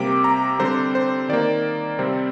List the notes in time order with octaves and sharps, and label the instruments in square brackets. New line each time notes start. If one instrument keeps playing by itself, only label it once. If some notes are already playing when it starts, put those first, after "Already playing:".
Already playing: [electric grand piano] C3 G3 A#3 D6
A#5
D3 G3 C4 C5
C5
D#3 A#3 D5
C3 G3 C4